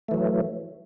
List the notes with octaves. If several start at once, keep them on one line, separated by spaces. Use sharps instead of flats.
E3 F#3 A3